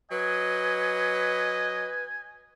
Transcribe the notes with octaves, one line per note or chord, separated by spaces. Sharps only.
F#3 B4 D#5 G#5